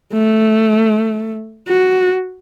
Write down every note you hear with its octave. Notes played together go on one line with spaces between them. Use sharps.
A3
F#4